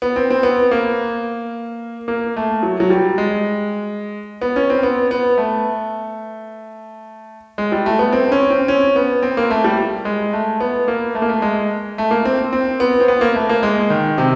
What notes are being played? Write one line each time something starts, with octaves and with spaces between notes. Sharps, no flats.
B3
C4
C4
B3
A#3
A#3
A3
F#3
F#3
G3
G#3
B3
C#4
C4
B3
B3
A3
G#3
G3
A3
B3
C4
C#4
C4
C#4
B3
C4
A#3
A3
G3
G#3
A3
B3
A#3
A3
A#3
A3
G#3
A3
A#3
C4
C4
B3
C4
B3
A#3
A3
A#3
G#3
D#3
C3